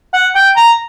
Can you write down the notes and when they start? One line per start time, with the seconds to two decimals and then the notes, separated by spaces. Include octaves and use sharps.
0.14 F#5
0.35 G5
0.57 A#5